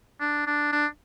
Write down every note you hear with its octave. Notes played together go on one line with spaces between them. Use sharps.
D4
D4
D4